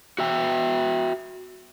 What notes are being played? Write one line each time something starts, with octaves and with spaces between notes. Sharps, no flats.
F#4 E5 G5